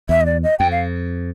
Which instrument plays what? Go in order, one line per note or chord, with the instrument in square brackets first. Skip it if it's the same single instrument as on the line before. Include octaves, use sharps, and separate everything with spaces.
[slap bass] E2 [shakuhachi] E5
[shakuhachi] D#5
D5
D#5
[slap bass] F2 [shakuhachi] G5
[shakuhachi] F5